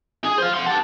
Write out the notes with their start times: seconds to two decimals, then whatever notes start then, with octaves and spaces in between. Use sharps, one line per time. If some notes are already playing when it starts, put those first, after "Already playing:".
0.24 G#4
0.38 C5 F5
0.54 F#5 C6
0.67 G4 A5